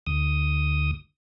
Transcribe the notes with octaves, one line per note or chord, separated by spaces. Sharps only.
D2 D#6